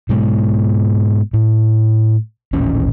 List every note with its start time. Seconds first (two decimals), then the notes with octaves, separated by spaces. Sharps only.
0.09 G#2 B2 G#3
1.33 A2
2.53 D#1 A1 C#4